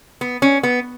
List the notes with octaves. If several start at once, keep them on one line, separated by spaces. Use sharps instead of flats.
B3
C#4
B3